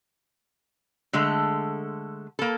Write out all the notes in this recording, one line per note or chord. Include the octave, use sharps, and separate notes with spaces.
D3 G#3 A3 A4
A#3 A4